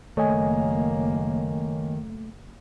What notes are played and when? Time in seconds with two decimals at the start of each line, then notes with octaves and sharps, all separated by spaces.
0.17 F#1 D#3 A3 A#3 C#5 D#5 G#5